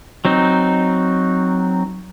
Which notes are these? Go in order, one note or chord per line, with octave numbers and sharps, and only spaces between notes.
F#3 C4 D#4